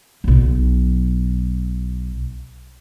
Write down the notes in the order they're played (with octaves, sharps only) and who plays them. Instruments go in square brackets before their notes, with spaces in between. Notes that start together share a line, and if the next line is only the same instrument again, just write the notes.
[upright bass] B1 F#3